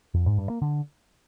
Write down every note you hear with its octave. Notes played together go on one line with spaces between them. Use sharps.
F2
G#2
G2
A#3
D3